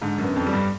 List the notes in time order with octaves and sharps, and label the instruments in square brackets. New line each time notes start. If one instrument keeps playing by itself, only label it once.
[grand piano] G#2 [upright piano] D3
[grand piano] F#2
[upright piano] B3
[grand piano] F2
[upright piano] G3
[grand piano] G2